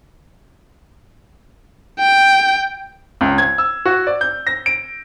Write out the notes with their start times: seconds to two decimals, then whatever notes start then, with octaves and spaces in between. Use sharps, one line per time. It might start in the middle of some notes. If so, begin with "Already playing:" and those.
2.00 G5
3.21 C#2
3.38 G#6
3.58 E6
3.85 F#4
4.07 D5
4.21 G6
4.47 A#6
4.66 D7